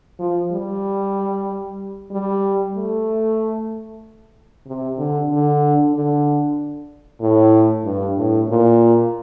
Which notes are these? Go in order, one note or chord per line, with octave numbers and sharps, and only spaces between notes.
F3
G3
G3
A3
C3
D3
D3
D3
A2
G2
A2
A#2